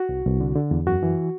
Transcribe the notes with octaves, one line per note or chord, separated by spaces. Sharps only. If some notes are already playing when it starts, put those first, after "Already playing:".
Already playing: F#4
C2
C2
D3
D3
E2
F#2 F#4
E3